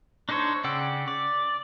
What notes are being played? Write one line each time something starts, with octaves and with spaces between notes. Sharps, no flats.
D4 D#4 A4 C5 C#5
C#3 D5 F#5 G5 E6
D5